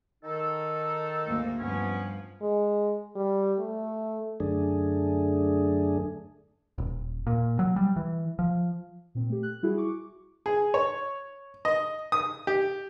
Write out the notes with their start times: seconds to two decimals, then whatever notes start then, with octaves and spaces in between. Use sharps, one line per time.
0.23 D#3 D#4 A4
1.25 D2 G#2 A#3
1.59 G2 F3 B3 C#4
2.42 G#3
3.16 G3
3.58 A3
4.40 F#2 D3 A3 D4 G#4
6.78 D#1
7.27 A#2
7.59 F#3
7.76 G3
7.96 E3
8.39 F3
9.15 A#2 C4
9.30 A3 G4
9.43 F#6
9.63 G3 E4 F#4 G#4
9.78 C#6 D6
10.46 G#4
10.74 C#5
11.65 D#5
12.12 D#6
12.47 G4